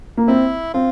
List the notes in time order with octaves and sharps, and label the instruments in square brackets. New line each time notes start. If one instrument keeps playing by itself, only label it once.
[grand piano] A#3
[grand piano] C4 [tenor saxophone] E4
[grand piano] C4 [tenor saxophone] F4